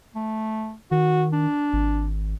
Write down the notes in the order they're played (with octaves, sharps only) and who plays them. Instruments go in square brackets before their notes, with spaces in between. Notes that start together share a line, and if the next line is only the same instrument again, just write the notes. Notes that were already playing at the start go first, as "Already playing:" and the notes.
[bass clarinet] A3
[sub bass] D#3 [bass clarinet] F#4
[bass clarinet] D4
[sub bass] G#1